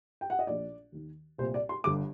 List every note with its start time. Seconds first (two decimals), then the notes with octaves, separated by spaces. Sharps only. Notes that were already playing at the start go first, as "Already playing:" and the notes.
0.21 G5
0.30 F#5
0.39 D#5
0.47 A#1 A#2 D5
0.92 D#2 D#3
1.38 C2 A#2 C5
1.54 D5
1.69 C6
1.84 G1 G2 D3 D6